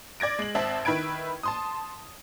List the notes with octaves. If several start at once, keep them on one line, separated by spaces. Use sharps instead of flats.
D5 G#6 A#6 D7
G#3 F#7
G#1 C4 E5 A5 F#7
D#3 E4 B4 B5 G#6 D7
A5 C6 D#6